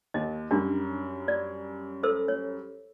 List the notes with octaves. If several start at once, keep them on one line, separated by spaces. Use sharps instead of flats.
D#2 D#5
F#2 G3 D4
D5
A4 C5 E6
C#5